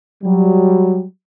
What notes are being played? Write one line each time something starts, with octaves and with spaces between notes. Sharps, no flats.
F#3 G3